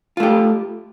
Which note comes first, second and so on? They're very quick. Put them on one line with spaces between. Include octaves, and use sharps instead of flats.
F4 A3 G4